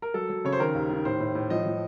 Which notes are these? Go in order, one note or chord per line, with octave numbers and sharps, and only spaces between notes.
A#4
F#3 A4
F#3
C#3 C#5
C5
D#3 A#4
D#2
D#3
A2 C5
A2
A2
F3 D#5
F3